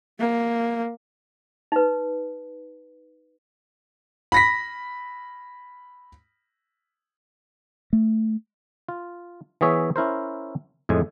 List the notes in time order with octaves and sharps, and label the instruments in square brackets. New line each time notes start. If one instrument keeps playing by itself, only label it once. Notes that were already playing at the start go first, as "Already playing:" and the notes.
[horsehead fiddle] A#3
[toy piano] D#4 B4
[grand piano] B5 A#6 B6
[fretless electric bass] A3
[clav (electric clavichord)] F4
E3 B3 G#4 C#5 E5
C#4 E4 A#4 C5
F2 A2 G#3 G#5